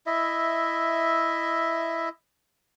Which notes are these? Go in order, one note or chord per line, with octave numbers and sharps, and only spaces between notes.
E4 D#5 E5